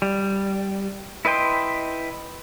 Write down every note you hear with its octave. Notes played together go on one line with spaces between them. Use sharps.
G3
E4 B4 D#5 G5 C6